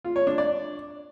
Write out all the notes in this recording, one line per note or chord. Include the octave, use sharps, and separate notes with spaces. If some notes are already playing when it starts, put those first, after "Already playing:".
F4
C#5
D4
D5